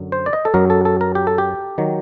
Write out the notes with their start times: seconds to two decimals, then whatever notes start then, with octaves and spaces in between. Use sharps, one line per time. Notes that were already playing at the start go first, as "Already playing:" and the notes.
Already playing: F#2 D3 F#3
0.12 C5
0.26 D5
0.33 D#5
0.45 A4
0.54 F#2 F#3 A#4
0.70 A4
0.85 A4
1.01 A#4
1.15 G4
1.27 A4
1.38 G4
1.78 D#3 F#3